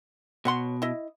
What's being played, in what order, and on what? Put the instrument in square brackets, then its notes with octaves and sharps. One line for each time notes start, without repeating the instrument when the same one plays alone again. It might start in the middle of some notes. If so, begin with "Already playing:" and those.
[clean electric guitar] B2 [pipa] C#5 F#5 C6
[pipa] E4 D#5